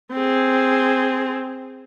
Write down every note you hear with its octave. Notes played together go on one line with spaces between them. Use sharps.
C4 G#4